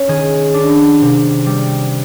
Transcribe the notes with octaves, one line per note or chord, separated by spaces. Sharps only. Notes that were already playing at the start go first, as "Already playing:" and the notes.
Already playing: C#4
D#3 G#4
D4
C3
G3